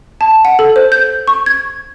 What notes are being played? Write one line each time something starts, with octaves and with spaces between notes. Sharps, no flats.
A5
F#5
A4
C5
G6
C#6
G#6